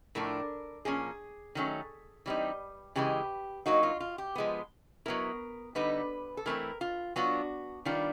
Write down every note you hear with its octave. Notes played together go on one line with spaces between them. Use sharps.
A2 F3 A3 D4 A#4
A#2 F3 A#3 C#4 G#4
D#3 F#3 A3 C#4
E3 G3 C4 D#4
C#3 E3 G#3 G4
F#3 A#3 D#4 F#4
F4
F4
G4
F3 G#3 B3
F#3 B3 E4 A#4
D3 G3 B3 D#4 B4
A4
E3 A3 C4 E4 A#4
F4
F#3 B3 D4 F4 F#4
D#3 G3 B3 D4 F4